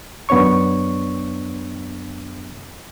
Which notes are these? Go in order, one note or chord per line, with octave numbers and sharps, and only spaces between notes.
F#2 B3 D4 C#5 C#6